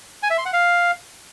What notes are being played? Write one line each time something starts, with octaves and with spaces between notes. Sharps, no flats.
G#5
E5
C6
F#5
F5